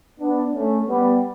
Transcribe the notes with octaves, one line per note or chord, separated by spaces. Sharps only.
B3 D4
A3 C#4
G3 B3